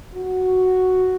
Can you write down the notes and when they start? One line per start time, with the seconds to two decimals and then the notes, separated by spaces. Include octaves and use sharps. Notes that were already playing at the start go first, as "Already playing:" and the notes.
0.15 F#4